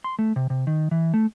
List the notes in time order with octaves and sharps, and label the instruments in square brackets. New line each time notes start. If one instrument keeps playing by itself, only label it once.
[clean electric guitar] C6
A3
C3
C3
D#3
E3
A3